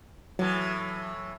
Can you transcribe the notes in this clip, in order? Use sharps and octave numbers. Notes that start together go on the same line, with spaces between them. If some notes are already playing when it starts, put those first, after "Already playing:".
A2 E3 F#3